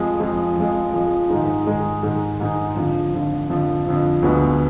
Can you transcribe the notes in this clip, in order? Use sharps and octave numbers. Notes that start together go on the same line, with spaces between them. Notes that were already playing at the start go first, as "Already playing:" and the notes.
Already playing: F2 F3 G#3
F2 F3 G#3
F2 F3 G#3
F2 F3 G#3
G#2 D#3 G#3 D#4
G#2 D#3 G#3 D#4
G#2 D#3 G#3 D#4
G#2 D#3 G#3 D#4
F2 D3 F3
F2 D3 F3
F2 D3 F3
F2 D3 F3
D2 D3 G#3 B3